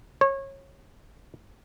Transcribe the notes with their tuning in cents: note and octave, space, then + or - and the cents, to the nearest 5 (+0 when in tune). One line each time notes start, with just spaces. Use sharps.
C#5 -25